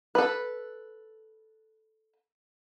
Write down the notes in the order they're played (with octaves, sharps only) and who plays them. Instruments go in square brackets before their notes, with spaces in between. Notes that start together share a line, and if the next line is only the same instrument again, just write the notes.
[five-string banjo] A4 B4